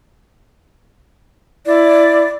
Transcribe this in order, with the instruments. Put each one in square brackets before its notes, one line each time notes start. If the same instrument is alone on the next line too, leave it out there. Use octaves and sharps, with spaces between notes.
[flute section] E4 D5